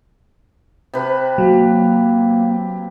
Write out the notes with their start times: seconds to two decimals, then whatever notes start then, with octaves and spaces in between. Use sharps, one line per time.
0.94 C3 B4
1.38 F#3 A#3